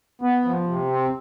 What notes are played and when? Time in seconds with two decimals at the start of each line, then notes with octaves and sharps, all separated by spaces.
0.22 B3
0.44 F3
0.66 C3
0.89 C4